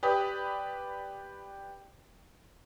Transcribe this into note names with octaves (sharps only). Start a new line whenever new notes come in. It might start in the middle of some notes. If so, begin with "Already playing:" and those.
G4 B4 D5 D#6